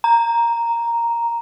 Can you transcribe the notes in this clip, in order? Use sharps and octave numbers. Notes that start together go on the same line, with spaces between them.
A#5